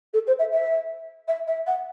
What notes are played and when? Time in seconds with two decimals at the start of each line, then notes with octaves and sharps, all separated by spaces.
0.13 A4
0.27 C5
0.39 E5
0.52 E5
1.28 E5
1.47 E5
1.66 F#5